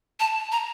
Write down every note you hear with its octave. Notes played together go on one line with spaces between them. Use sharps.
A5
A#5